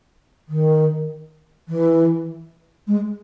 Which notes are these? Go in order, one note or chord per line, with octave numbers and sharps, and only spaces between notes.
D#3
E3
G#3